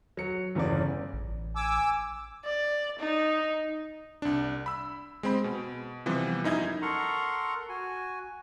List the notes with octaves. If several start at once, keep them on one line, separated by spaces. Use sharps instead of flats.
F#3 C#7
G1 E2 C#3 C#4 D5
A1
G#5 D6 E6
D5
D#4
C2 D4
B5 E6
G#3 C4 B5
B2
C3 E3 F3 G3 B3
F#2 D#4 E4 D#5 G#6
A4 A#4 F#5 A#5 C6 C#6
F#4 G#5